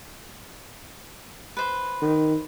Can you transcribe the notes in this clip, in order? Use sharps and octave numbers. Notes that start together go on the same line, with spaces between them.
B4 C5
D#3